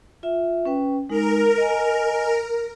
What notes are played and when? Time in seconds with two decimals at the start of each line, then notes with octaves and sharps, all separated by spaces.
0.23 F4 E5
0.65 C#4 B4 G5
1.09 G#3 D#4 A#4
1.58 D#5 G#5